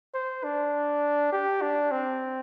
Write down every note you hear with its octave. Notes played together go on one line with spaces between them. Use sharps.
C5
D4
G4
D4
C4